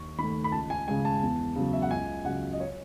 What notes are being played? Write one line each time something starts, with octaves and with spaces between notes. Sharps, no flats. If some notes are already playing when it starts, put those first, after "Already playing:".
Already playing: D#2 C#6
D#3 A3 B5
B5
C#2 A5
G#5
C#3 G#3 G#5
A5
E2
C#3 F#3
E5
F#5
C#2 G#5
C#3 F#3 F#5
D#5
C#5